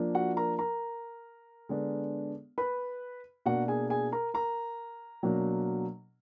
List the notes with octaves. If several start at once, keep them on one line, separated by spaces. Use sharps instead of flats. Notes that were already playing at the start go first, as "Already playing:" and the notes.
Already playing: F3 A#3 D4
F#4 F#5
A#4 A#5
A#4 A#5
D3 G#3 B3 D4
B4 B5
B2 A#3 D4 F#4 F#5
G#4 G#5
G#4 G#5
A#4 A#5
A#4 A#5
B2 F#3 A#3 D4